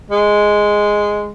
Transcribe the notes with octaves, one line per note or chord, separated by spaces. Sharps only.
G#3